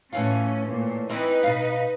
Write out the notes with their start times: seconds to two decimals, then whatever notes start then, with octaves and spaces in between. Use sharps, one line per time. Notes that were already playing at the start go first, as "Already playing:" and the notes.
0.13 A2 E3 C#4 F4
0.67 A#2
1.10 E3 C4 D#4 B4
1.43 B2 F5